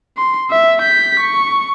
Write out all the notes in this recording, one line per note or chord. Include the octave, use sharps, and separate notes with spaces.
C6
E5
G6 B6
C#6